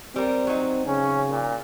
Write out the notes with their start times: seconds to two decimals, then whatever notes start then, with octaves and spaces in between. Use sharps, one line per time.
0.16 G3 C4 A#4
0.47 F#3 D#4
0.87 C#3 C#4
1.31 A#2